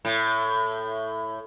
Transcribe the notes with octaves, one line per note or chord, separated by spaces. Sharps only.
A2